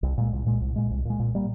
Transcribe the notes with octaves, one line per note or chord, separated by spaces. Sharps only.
C2
A#2 G#3
C2
A#2 G#3
C2
A#2 G#3
C2
A#2 G#3
A#2
G3 A#3